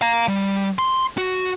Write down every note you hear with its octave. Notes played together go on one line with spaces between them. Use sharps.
F5 A#5
G3
C6
F#4